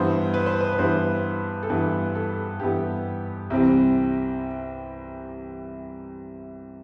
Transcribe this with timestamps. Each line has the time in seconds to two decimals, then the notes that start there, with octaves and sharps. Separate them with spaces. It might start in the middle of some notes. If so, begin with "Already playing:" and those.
Already playing: G2 E3 B3 C5
0.34 B4
0.46 C5
0.61 B4
0.72 B4
0.79 G2 E3 B3 C5
1.63 A4
1.70 G2 E3 B3 B4
2.15 A4
2.60 G2 E3 B3 G4
3.50 C2 C3 E3 G3 C4 G4